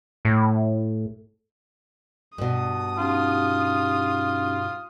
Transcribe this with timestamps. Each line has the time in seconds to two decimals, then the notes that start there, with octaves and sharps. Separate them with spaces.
0.25 A2
2.38 G2 B2 D#6
2.98 C#4 D#4 F4 G4